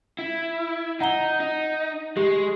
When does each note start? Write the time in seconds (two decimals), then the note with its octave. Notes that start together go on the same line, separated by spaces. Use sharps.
0.19 E4
1.01 D#4 F#5 A#5 G7
1.40 D#4
2.17 G#3 G4